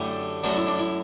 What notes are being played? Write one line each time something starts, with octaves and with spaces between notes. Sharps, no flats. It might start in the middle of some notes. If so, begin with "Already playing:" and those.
Already playing: F#2 D3 A3 E4 G4
F#2 F#3 A3 D4 F#4
E4
D4
E4